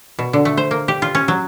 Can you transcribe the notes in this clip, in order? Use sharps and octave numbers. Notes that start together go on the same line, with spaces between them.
B2
D3
A3
C5
A#3
G4
F4
C#4
F#3